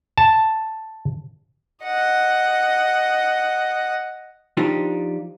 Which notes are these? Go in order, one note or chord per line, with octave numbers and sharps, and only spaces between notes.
A5
D#5 F#5
F3 D4 D#4 F4 G4